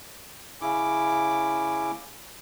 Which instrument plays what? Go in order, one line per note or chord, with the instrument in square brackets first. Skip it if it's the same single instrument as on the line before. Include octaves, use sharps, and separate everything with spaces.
[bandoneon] C#3 C#4 E4 D6